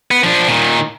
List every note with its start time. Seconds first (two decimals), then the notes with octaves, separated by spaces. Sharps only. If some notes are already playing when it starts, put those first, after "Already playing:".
0.11 B3
0.24 F3 D4
0.48 A#2 D#3